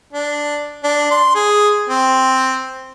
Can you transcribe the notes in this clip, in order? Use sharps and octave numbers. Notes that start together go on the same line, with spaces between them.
D4
D4
C6
G#4
C4